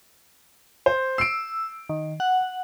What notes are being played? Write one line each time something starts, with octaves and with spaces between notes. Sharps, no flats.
C5
E6 C7 D7
D#3
F#5